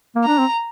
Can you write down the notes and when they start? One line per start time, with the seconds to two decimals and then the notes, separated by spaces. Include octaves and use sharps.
0.16 A#3
0.24 D4 A#5
0.39 C4